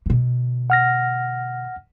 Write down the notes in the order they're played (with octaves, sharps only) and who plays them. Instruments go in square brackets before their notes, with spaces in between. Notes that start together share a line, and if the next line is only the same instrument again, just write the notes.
[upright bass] B2 D3
[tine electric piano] F#5 F6 A#6